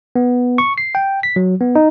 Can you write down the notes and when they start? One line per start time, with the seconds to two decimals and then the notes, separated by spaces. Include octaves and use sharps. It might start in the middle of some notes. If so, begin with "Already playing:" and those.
0.16 B3
0.58 C#6
0.78 C7
0.95 G5
1.23 B6
1.36 F#3
1.61 B3
1.76 D#4